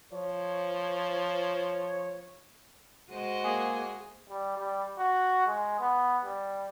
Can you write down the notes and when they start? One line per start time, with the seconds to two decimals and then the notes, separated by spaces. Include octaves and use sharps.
0.13 F3 C#5
3.11 G#3 F#4 C5 D#5
3.44 A#3 G#4 G#5
4.30 G3
4.58 G3
4.98 F#4
5.47 G#3
5.80 B3
6.25 G3